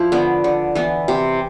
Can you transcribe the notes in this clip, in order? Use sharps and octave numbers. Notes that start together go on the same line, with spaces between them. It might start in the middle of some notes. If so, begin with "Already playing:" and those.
Already playing: F3 E4
D3 B3
D3
E3 B3
C3